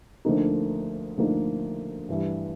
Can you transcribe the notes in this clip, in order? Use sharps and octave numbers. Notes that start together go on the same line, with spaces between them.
D2 D3 F3 A#3 D#4
D2 D3 F3 A#3 D#4
G2 E3 G3